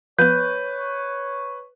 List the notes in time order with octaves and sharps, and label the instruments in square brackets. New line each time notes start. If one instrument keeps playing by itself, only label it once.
[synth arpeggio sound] F3 B3 [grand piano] B4 [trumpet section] C#5 [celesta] G6